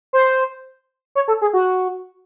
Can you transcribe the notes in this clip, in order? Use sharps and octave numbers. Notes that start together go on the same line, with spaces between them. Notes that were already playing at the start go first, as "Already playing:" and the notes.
C5
C#5
A4
G#4
F#4